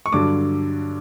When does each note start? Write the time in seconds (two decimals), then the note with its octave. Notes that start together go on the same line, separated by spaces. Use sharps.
0.06 C#6
0.12 G2 D3 F#3 D6